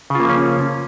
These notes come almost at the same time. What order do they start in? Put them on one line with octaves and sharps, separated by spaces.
C#3 F4 A#3 F3 C#4